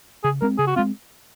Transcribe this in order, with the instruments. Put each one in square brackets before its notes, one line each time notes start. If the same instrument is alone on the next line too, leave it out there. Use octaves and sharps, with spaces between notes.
[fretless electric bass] C#3 [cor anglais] G#4
[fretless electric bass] G#3 C4 [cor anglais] A#4
[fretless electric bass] C#3 [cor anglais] G#4
[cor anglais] F#4
[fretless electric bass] G#3 C4 [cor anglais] F4